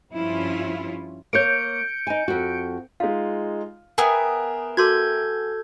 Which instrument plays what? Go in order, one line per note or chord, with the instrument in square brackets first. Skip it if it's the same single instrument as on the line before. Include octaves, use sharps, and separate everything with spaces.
[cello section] G2 F3 C#4 E4 F4
[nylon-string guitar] A#3 C#5 [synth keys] G6 C#7 D7
[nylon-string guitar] D#4 G#5
F2 F#4
[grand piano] G#3 D#4 F4 [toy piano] F5
[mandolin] B3 G#4 [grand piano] A#4 E5 G5
[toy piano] F#4 C6 D6 [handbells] A4 G6 G#6